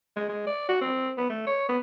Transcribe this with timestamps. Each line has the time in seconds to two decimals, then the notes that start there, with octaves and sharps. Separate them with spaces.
0.16 G#3
0.29 G#3
0.47 D5
0.69 F#4
0.81 C4
1.18 B3
1.30 A3
1.47 C#5
1.69 B3